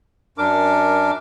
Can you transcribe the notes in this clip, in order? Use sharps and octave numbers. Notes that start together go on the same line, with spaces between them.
F#2 D4 A#4 D6